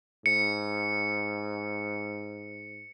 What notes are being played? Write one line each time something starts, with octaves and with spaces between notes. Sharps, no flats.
G#2 C#7